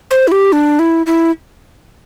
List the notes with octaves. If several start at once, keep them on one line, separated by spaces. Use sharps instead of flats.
C5
E4
G4
D4
E4
E4